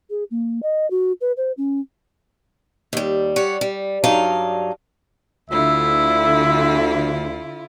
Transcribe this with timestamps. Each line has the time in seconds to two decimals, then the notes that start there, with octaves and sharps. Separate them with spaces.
0.10 G#4
0.31 A#3
0.63 D#5
0.91 F#4
1.21 B4
1.37 C5
1.57 C#4
2.93 D#2 G3
3.36 G3 C#5 F#5
3.61 G3
4.04 G2 F#3 D4 D#4 F5
5.50 D2 D3 E4 F4 E5